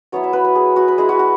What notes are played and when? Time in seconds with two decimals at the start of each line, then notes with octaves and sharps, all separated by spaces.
0.12 F#3 B3 E4 C#5
0.24 E5
0.33 B4
0.44 B4
0.55 G#4
0.76 F#4
0.88 B4
0.98 G#3 E4 G#4
1.09 F#4
1.19 F#4